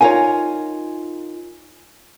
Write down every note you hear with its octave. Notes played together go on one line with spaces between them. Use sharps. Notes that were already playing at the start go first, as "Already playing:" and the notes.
D#4 F4 A#4 C#5 G#5